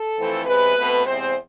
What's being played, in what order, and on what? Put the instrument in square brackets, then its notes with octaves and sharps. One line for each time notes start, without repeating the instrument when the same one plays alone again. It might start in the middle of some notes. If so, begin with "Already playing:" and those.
Already playing: [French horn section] A4
F2 E3 A3 C4
E2 C3 G#3 B4
B2 A3 C4
E2 C3 G#3 C4 C5